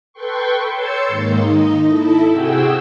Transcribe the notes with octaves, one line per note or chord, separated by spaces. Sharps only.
A4 B4 G5 C6 C#6
C#5 C6 E6 G6 A6 C#7
G#2 D#3 A#3
D#4 D#5
E4 A4
C3 F#4 G#4 G5 E6